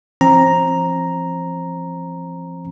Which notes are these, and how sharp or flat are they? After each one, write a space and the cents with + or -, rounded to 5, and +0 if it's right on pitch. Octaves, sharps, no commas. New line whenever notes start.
F3 -35 C4 +25 A#5 +0